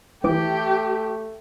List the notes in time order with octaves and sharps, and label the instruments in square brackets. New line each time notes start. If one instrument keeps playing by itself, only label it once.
[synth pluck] E3 D6 [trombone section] A3 [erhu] G4